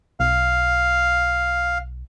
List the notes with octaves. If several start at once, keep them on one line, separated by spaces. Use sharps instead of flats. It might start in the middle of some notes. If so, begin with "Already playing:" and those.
B1 F5